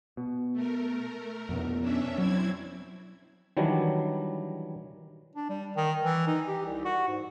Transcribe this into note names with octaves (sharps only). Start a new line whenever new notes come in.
B2
A3 A#4
F2 B2 B3
C#4 D4 E5
F#3 C4 E4 G#6
D#3 E3 F#3 G3 D4
D4
G3
D#3
E3
D#4
G4
C2
F#4
G#2